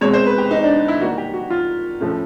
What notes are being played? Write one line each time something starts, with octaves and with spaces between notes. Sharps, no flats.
B2 G#3 C4 C#5
C5
B4
G4
D#4
D4
E4
D#3 G3 A#3 F#4
G4
F#4
F4
A2 F3 A3 C#4